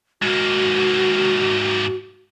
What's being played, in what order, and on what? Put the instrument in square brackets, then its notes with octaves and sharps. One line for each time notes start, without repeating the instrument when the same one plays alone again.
[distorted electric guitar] G#2 A#3 [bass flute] F#4